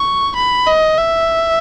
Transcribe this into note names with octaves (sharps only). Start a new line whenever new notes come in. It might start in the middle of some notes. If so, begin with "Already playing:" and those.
Already playing: C#6
B5
D#5
E5